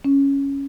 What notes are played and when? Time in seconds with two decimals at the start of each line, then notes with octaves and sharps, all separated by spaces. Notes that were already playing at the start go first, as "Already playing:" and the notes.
0.04 C#4